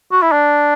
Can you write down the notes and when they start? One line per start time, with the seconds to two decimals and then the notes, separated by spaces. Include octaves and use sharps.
0.12 F#4
0.22 E4
0.32 D4